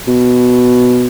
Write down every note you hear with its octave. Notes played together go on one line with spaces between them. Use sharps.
B2